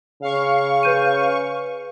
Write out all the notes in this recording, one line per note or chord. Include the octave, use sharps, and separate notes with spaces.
C#3 F5 C#6
B4 G6 D#7